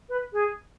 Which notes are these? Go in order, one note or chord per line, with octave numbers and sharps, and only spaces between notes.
B4
G#4